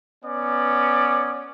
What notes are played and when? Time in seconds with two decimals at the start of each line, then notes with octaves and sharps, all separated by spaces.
0.24 B3 C#4 D5